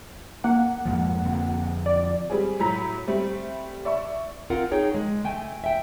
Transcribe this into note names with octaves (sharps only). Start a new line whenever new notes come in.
A#3 F#5
F2 G#2 F3
F2 D3 C4
D5
G3 C4 G#4
A2 F#3 A#5 B6
G3 A3 C4
D5 E5 C#6
C4 F4 A#4 F5 F#5
D#4 G#4 C#5 G5
G#3
A3 G5 G#5
E5 G5